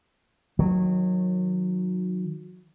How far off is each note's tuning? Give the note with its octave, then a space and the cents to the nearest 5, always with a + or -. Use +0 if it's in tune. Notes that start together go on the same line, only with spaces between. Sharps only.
D#3 +0 F#3 -20